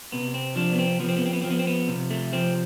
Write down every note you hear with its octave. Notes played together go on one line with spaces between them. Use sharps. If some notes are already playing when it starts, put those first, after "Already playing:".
C3 B3
C4
F3 D4
B3
C4
F3 B3
C4
B3
C4
B3
F3 C4
B3
C4
B3
C3
A3
F3 C4